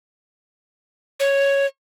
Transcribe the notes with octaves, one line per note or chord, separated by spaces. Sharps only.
C#5